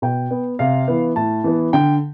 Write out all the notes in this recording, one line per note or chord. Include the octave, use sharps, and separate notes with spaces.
B2 G5
B3
C3 F5
E3 B3
A2 A5
E3 B3
D3 G5